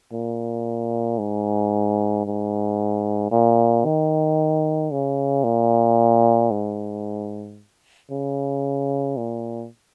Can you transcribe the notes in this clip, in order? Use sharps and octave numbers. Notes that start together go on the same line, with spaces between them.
A#2
G#2
G#2
A#2
D#3
C#3
A#2
G#2
C#3
A#2